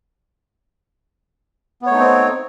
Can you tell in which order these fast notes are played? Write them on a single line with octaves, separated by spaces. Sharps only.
B3 C#5 A3 D#4 C4